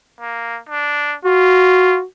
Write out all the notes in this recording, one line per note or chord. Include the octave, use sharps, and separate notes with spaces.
A#3
D4
F4 F#4